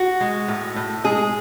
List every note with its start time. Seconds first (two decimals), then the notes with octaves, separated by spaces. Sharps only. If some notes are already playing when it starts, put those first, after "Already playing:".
Already playing: F#4
0.21 G#3
0.48 A2
0.76 A2
1.04 G#3 G#4